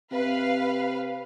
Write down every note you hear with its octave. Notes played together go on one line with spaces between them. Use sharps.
C3 B4 F5